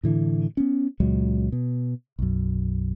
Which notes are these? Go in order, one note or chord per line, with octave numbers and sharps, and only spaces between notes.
A2 D3 E3
B3 C#4
C#2 A#2 F#3 G#3
B2
B1 F#2